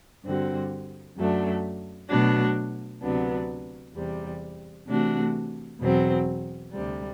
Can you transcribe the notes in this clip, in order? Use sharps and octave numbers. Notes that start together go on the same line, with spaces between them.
G2 D3 G3 C4 F#4
F#2 F#3 A3 D4
B2 F#3 A3 D4 F#4
D2 C3 F#3 B3 D4
E2 C3 G3
C3 E3 A3 D4 F#4
E2 B2 F#3 C4
D2 C3 G3